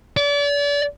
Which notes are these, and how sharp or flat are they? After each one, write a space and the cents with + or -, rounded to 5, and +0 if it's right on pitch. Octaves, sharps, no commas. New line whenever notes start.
D5 -35